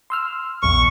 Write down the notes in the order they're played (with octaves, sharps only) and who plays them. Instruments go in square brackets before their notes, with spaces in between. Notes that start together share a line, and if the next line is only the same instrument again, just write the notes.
[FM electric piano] C6 E6 F6
[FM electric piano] A#1 E2 [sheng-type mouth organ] C#6